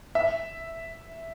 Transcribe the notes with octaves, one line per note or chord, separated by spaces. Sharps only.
E5